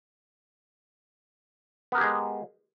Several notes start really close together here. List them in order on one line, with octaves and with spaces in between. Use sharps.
B3 A#4 G4 G#4 G#3